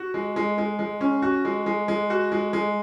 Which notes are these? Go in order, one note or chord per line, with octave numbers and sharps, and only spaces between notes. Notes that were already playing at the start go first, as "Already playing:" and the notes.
Already playing: F#4
G#3
G#3
G#3
G#3
C#4
F#4
G#3
G#3
G#3
F#4
G#3
G#3